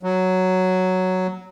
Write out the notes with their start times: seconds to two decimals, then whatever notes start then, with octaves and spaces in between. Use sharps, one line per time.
0.03 F#3